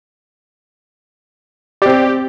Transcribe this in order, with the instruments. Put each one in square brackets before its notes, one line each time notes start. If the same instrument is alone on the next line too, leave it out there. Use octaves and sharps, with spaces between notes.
[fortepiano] C4 D5 [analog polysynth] G4